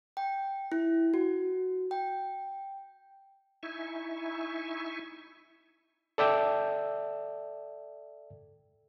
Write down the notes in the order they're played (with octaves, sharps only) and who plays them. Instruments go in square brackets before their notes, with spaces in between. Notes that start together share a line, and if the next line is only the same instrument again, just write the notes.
[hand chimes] G5
E4
F#4
G5
[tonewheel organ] D#4 E4 E5 G#5 C#6
[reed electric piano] A4 D5 E5 G5 E6